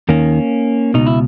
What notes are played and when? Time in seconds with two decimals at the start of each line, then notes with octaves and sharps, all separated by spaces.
0.09 D#2 D#3 A#3 C#4
0.94 C#2 B2 D#4
1.07 E4